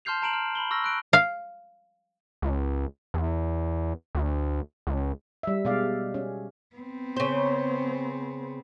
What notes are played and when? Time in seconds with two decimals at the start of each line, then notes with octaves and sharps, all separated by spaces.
0.05 A5 C6 F6 G6 C7 F7
0.22 A5 A#5 D7 E7 F#7
0.33 F6
0.55 B5 F#7 G7
0.71 C#6 E6 F6 A#6
0.84 F#6 D7
1.13 F5
2.42 C#2
3.14 E2
4.15 D2
4.87 C#2
5.43 G3 E5
5.65 B2 G#3 G4 D5 F5
6.14 C#4
6.76 B3 C4
7.16 C#3 C5